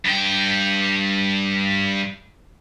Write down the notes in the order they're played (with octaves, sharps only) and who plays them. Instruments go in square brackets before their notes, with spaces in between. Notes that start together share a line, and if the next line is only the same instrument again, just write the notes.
[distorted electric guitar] G2 G5